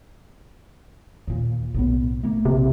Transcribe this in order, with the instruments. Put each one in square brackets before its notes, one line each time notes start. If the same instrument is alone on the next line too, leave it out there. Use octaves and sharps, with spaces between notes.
[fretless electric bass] D#2 A#2
B1 A2 B3
A3 A#3
[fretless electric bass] A#1 [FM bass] C3